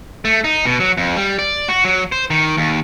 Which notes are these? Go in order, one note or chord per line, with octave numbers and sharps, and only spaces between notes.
A3
D#4
B2
F#3
F2
G3
D5
F#4
F#3
C5
D#3
D#2